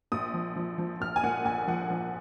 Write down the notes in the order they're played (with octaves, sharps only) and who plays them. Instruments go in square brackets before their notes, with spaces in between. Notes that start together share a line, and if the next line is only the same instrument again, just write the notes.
[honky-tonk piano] A#1 D#6
F3
F3
F3
A#1 F6
G#5
A#2 F#5
A#1 G#5
F3 F#5
F3